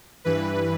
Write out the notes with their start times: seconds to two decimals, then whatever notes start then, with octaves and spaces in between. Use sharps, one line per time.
0.24 G2 E3 B4